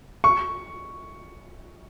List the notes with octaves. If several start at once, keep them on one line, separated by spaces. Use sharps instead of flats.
C#6